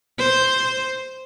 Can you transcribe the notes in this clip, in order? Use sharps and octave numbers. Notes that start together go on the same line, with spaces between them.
C5